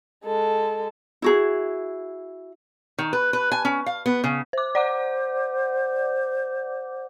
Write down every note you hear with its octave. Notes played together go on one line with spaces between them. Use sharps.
G#3 A4
E4 F#4 G#4
D#3
B4
B4
G#5
C#4
F5
B3
C#3
C5 D6
C5 D5 F#5 D6